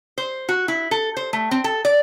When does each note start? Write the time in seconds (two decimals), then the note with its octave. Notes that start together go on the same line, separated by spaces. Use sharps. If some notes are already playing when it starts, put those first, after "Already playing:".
0.18 C5
0.49 F#4
0.68 E4
0.91 A4
1.17 C5
1.33 A3
1.51 C4
1.64 A4
1.85 D5